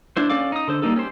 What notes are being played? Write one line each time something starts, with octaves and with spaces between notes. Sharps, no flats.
D4 E4 C5
C#4 A4 D5 F5 D6
D#4 D#6
D3 A4 C5
G3 A#3 D#4 A4
C#4 G4 C5